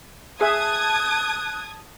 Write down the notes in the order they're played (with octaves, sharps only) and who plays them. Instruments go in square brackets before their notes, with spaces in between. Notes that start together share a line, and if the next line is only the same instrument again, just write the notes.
[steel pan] G#4 E5 [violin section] A5 D#6 G#6 [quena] F#6